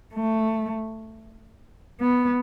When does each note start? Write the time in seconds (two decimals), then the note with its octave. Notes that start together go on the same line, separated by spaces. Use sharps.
0.13 A3
2.01 B3